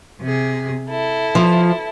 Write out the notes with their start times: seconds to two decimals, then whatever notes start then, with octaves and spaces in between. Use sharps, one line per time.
0.20 C3 G#4
0.88 E4 A4
1.35 F3